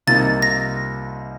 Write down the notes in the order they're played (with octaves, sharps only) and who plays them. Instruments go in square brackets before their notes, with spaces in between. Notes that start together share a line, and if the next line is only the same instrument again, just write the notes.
[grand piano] C2 C3 F3 A#3 D#4 [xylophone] A6
[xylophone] A#6